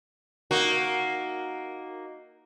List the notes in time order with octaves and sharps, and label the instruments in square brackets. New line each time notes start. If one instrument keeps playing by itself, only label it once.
[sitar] A#3 D#4 F#4